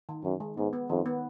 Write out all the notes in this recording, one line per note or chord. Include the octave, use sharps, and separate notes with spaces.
D#3
F#2 D#3
G#3
G#2 B3
B3
F2 D#3
B3